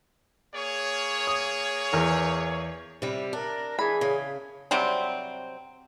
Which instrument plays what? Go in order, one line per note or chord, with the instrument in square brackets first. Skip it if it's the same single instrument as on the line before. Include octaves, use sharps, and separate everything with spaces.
[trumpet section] A#3 G#4 C#5
[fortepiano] D#6
E2 A#4
[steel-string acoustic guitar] C3 G3
[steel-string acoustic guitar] D4 [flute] A#4
[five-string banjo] E3 B5 [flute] G#4
[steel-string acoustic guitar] C#3
[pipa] C3 F#3 G3 C4